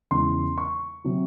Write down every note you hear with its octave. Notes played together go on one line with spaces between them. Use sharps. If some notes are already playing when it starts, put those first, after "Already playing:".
E2 C#3 G#3 C6
C#6
C3 F#3